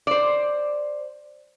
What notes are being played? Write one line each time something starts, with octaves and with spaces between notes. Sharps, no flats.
C5 D5